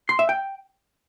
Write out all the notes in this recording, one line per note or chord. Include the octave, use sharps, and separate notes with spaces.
C6
E5
G5